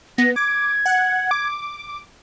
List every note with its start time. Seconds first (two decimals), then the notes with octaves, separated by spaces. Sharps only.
0.18 B3 A#6
0.36 D6 G#6
0.86 F#5
1.31 D6